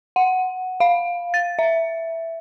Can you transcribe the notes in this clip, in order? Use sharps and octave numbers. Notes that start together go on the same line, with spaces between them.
F#5
F5
A6
E5